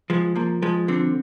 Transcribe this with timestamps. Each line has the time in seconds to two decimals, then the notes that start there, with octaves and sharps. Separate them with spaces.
0.10 F3 G#3
0.35 F3 A#3
0.62 F3 G#3
0.88 D3 C4